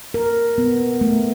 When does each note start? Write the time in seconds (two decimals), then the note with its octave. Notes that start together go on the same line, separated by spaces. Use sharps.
0.14 A#4
0.58 B3
1.01 A3